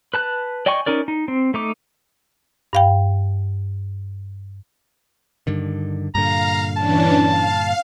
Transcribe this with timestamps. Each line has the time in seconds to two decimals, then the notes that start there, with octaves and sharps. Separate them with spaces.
0.14 B4 A5 F#6
0.66 D5 D#5 G5 G#5 C#6
0.86 C#4 D#4 A#4 D5
1.08 D#4
1.28 C4
1.54 A3 D#4 D6
2.73 G2 F5 G5
5.47 G2 D3 D#3
6.15 G2 A#2 D3 F5 A#5
6.76 E3 C#4 D4 A5
7.23 F5